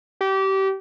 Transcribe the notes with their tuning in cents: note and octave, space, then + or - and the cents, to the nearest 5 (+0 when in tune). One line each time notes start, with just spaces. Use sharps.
G4 -25